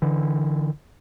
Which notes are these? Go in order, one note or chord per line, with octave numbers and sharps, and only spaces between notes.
D3 E3